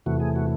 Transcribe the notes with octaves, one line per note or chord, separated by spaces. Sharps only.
E2 C3 E3 A3 F#4
G#4
F#4